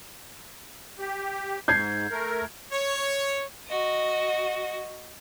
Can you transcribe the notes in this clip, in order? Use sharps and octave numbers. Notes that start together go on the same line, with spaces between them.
G4
G#2 G6 G#6 C7
A3 A#4
C#5
F#4 D#5